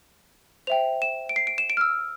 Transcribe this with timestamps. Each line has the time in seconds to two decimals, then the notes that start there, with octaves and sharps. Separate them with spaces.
0.67 C5 E5 G5 F7
1.02 E7
1.29 D7
1.36 C7
1.47 D7
1.58 E7
1.70 D7
1.77 F6
1.81 E6